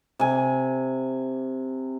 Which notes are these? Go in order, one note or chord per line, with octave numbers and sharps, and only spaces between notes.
C3 G#5